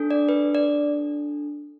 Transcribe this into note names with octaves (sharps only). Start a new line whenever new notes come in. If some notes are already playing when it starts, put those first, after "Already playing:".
Already playing: D4 A4
D5
B4
D5